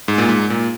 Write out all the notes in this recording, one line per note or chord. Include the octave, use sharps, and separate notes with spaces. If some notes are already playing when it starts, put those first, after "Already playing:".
G#2
A#2
G#2
A#2